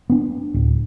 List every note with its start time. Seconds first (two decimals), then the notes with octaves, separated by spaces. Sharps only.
0.10 B3 D4
0.54 D1